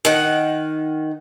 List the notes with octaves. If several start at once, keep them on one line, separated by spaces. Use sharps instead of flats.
D#3 F#5